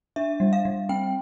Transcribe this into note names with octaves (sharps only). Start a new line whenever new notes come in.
D4 E5
G3
F5
G3
C4 G5